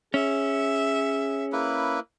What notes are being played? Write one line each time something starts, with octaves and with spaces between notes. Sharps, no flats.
C#4 G#4 E5
A#3 E4 B4